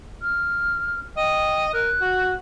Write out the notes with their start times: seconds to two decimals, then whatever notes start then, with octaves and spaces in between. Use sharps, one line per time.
0.22 F6
1.17 D#5 G5
1.73 A#4 F#6
2.01 F#4